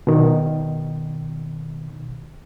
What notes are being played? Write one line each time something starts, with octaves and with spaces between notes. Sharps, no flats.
B2 D#3